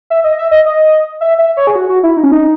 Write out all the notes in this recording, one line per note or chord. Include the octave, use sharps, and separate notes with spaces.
E5
D#5
E5
D#5
D#5
E5
E5
C#5
G#4
F#4
F#4
E4
D#4
C#4
D#4